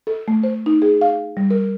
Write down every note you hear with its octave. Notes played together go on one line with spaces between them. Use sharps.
A4
A3
C5
D#4
G#4
F5
G3
A#4